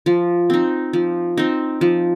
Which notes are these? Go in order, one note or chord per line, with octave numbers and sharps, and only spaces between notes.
F3
C4 D#4
F3
C4 D#4
F3